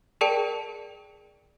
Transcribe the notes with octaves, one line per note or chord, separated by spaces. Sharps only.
G#4 A#4 D5 G5 A5 C#7